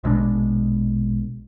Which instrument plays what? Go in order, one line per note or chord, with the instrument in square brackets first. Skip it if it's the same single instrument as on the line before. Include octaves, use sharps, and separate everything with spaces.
[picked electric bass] A#1 B2 G#3 D4